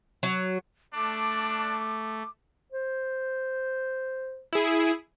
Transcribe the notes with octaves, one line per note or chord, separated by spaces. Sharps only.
F#3
A3 D4 D6
C5
E4 G#4